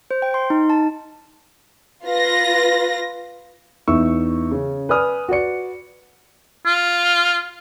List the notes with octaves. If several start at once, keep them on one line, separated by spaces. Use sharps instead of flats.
C5
G5
C6
D#4
A5
F4 B4 A#6
E2 D#4 E5 C#6 E6
C#3 C#4
B4 D5 G#5 D#6 F6
F#4 B4 D5 C#7
F4